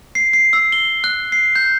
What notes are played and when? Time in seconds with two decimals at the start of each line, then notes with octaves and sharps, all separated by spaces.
0.15 C7
0.33 C7
0.53 E6
0.72 G7
1.04 F#6
1.32 C7
1.56 G6